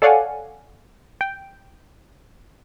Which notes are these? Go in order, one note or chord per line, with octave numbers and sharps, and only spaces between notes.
A4 C#5 D5 F5 F#5 G#5
G5